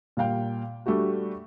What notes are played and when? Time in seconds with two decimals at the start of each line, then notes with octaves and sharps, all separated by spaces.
0.17 A#2 G3 F5 G5
0.86 G3 A3 D4 F#4 G4